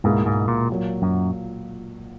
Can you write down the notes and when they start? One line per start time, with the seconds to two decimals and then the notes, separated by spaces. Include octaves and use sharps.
0.04 C#2 G#2 B2 A#3 E4 G#4
0.26 G#2
0.48 A#2
0.70 A#2 F#3 A#3
1.02 F#2